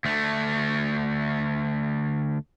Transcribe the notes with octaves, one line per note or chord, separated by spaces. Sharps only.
D2 A3